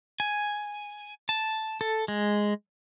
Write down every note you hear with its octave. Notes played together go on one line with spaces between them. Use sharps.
G#5
A5
A4
G#3